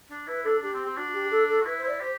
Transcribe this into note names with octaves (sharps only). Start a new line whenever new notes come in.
D4
E4 B4
D4 A4
D4 G4
C4
C4
D4 F#4
G4
A4
A4
F#4
E4 B4
C5
E4 D5
G4 C5